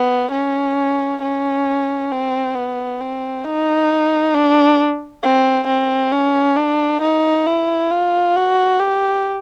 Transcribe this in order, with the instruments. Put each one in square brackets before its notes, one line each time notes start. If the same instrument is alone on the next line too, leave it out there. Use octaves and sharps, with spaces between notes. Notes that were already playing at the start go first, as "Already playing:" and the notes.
Already playing: [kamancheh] B3
C#4
C#4
C4
B3
C4
D#4
D4
C4
C4
C#4
D4
D#4
E4
F4
F#4
G4